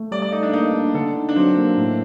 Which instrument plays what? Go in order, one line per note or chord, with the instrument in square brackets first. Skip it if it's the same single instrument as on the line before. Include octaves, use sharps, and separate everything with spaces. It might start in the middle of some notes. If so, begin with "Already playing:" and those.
Already playing: [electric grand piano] A3
[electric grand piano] G3 [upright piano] D5
[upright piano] D5
[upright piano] D#4 [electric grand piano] A4
[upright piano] D4
[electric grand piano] A#3 [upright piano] D#4
[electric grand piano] D4
[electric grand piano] D3 [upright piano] A4
[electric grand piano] D#4
[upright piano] D4
[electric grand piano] F#3 [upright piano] C4
[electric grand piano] A#3
A2